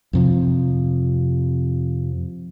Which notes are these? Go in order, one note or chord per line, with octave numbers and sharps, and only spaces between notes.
F2 C3 F3